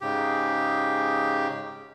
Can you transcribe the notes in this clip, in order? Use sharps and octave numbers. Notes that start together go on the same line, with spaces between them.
G#2 C#3 G4